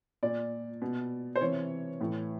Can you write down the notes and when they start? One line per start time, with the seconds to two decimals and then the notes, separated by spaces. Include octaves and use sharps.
0.23 A#2 D5
0.82 B2
1.36 C5
1.41 C3 E3 C#5
2.01 A2 E3